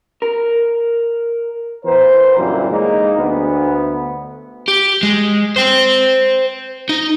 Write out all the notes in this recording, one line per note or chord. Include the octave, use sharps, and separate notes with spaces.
A#4
E3 B3 A#4 C5
F#2 A#2 D3 E3 F#3 G3
G#3 A#3 D#4
D2 B3
G4
G#3
C5 G5
D#4